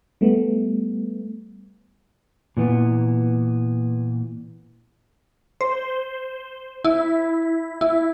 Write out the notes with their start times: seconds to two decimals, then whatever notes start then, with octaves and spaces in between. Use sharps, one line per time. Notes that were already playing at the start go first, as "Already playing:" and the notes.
0.21 G3 A3 B3
2.57 A#2 E3 B3
5.61 C5
6.85 E4
7.81 E4